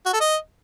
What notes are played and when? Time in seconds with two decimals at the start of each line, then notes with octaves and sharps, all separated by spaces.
0.06 F#4
0.13 A4
0.21 D#5